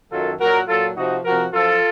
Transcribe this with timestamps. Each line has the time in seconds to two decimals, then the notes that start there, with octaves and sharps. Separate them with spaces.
0.12 F#2 D#3 F#3 F4 A4
0.40 A#2 F#3 F#4 A#4
0.68 A#2 F#3 F4 A4
0.97 C3 F3 D#4 F#4
1.25 C3 F3 F#4 A#4
1.53 F#2 F3 F4 A4